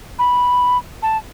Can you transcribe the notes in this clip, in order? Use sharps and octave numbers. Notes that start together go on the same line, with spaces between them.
B5
A5